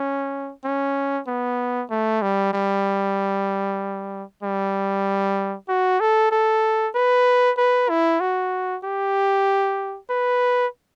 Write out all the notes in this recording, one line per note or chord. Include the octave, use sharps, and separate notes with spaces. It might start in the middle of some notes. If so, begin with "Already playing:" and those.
Already playing: C#4
C#4
B3
A3
G3
G3
G3
F#4
A4
A4
B4
B4
E4
F#4
G4
B4